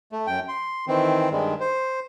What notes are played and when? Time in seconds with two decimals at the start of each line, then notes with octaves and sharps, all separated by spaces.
0.12 A3
0.27 F#2 G5
0.48 C6
0.88 D#3 E3 C4
1.31 G2 D#3 G3 G#3
1.60 C5